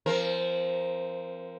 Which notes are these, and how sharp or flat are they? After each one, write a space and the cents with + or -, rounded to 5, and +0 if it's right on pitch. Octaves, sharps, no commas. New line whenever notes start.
F3 -25 C4 +0 A#4 +0